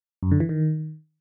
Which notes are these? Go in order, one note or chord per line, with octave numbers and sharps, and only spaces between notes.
F#2
D3
E3
D#3